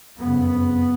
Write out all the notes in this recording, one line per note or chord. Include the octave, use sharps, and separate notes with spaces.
F#1 F2 C#3 B3